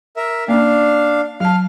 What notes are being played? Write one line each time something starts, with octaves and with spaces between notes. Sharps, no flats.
A#4 E5
A#3 C#4 D4 F5
F#3 F5 A5 F6